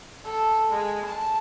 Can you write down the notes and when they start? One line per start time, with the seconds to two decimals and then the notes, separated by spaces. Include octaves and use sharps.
0.25 A4
0.70 G#3
1.05 A5